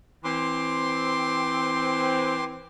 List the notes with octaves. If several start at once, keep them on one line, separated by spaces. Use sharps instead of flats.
E3 C4 C6 D6